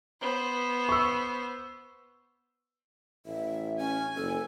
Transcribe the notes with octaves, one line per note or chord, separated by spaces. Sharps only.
B3 C5
C#6 E6
A1 E5
C#4 G#5
F#1 A4